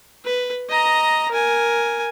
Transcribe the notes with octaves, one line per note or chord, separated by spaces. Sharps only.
B4
D#5 A#5
A#4 G#5